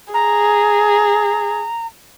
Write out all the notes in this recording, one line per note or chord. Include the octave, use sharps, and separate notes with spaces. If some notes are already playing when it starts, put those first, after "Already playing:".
G#4 A#5